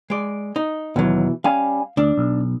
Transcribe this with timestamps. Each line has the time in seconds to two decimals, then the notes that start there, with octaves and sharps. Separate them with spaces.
0.10 G#3 D5
0.56 D#4
0.96 D#2 B2 D#3 E3 F#3
1.44 G3 C#4 F5 G#5
1.97 D2 D4
2.17 B1